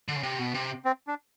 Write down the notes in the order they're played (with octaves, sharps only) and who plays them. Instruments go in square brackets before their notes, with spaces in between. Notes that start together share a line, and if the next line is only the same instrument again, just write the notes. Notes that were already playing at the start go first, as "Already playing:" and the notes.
[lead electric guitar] D3
C#3
C3
B2
C3
[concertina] C4
D4